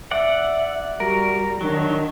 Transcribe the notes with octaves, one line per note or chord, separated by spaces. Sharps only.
D5 E5 F#5
G3 F#4 A#4
D#3 F#3 D4